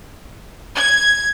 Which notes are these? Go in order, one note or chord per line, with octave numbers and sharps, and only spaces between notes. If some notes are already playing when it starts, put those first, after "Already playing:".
G#6